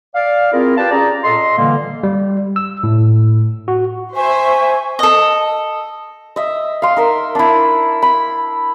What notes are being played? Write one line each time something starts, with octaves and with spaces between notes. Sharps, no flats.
D5 F5
C4 E4 F4 G#4 A#4
G4 B4 D5 F5 G5 A5
C#4 F4 G#4 D5 A#5
A#2 A4 D#5 C6
D3 E3 G3 A#3
G3
E6
A2
F#4
C5 E5 G#5 C#6
A4 D#5
D#5 E5
F5 C6
D#4 A#4 E5
D4 E4
B5